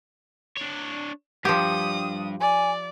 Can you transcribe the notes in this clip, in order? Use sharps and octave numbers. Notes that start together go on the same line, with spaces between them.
D4 C#5
G2 F3 G4 D#6
D5 G#5